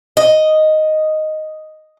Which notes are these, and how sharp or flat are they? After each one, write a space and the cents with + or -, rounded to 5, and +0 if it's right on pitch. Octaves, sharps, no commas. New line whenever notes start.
D#5 +0